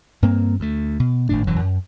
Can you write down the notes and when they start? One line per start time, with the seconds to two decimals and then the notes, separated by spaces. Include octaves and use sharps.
0.22 G2 A#3 C4
0.60 D2 A3
1.00 B2
1.29 G#1 A2 D4
1.47 E1 F#2 E3 F#3
1.60 F#2